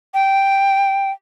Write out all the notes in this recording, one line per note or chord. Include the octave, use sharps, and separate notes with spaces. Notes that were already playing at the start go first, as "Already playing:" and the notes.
G5